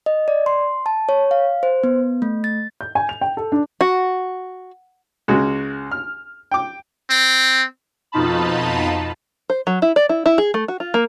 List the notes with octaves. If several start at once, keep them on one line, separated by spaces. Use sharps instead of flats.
D#5
D5
C6
A5
C#5
F5
C5
B3
A3
A6
G6
G#5
F7
G5
A4
D4
F#4
C#2 G#3 F#4
F6
G5 D6
C4
F2 B2 D#4 F4 A5 B5
C5
F#3
E4
D5
E4
E4
G#4
A3
F#4
F4
A#3